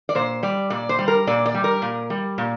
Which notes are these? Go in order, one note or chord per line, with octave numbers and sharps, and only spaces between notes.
D5
A#2 C5
G3 D5
A#2 D5
C5
G3
A#4
A#2 D5
D5
G3
A#4
A#2
G3
A#2